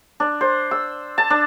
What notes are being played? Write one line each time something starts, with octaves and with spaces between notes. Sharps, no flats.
D4
C5
E6
A5
D4